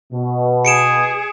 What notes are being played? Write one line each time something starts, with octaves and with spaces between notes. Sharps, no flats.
B2
G#4 C#7 D7 E7